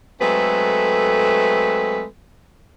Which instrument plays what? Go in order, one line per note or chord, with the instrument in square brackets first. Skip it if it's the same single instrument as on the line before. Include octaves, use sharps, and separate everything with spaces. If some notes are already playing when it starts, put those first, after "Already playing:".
[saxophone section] F#3 G#3 A3 C4 A4 B4